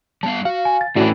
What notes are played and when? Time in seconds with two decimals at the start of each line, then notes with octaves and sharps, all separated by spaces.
0.23 G3 B3 F5 A5
0.45 F#4 F5
0.65 G#5
0.81 A6
0.96 A2 E3 C#4 D4 E4 F#4 D5